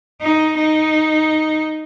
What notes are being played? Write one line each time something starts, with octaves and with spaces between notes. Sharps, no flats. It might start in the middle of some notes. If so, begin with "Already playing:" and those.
D#4
D#4